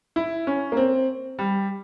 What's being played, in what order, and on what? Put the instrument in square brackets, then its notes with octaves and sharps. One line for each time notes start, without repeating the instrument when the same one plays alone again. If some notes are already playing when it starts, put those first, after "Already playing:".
[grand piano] E4
C#4
A#3
C4
G3